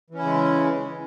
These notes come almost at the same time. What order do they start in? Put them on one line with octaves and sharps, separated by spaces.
E3 C#4 E4 C#3 G#3